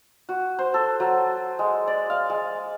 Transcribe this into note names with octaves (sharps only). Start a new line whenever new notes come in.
F#4
C5
A4
F#3
G#3
D5
F5
G#3